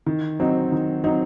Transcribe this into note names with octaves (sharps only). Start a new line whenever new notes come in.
D#3
F#3 C4 D#4
D#3
F#3 C4 D#4